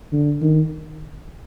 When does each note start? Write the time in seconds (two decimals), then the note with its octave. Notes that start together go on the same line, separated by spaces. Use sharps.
0.12 D3
0.41 D#3